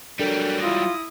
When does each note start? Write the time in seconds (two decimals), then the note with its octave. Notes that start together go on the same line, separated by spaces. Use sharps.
0.19 F#3 G3 D4 A4 A#4 G5
0.61 E4 F4 D#6 A#6